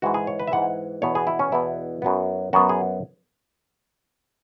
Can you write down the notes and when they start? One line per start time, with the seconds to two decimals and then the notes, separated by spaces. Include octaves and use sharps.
0.02 G#2 E3 G#3 F#4
0.14 G#4
0.27 C#5
0.39 B4
0.48 E5
0.52 G#2 E3 G#3 F#5
1.02 E2 B2 B3 C#5
1.15 G#4
1.27 E4
1.39 C#4
1.52 E2 B2 B3 E4
2.02 F#2 F#3 B3
2.53 F#2 F#3 B3 F#4
2.69 G#4